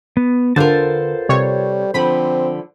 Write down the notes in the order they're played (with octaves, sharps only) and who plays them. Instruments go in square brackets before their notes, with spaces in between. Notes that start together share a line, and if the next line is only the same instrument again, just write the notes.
[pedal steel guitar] B3
[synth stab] D3 [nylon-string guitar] B3 F4 A#4 [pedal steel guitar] A4 C5 A5
[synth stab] C3 C#5 [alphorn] G3
[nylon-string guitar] D3 F3 [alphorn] C4 [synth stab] B5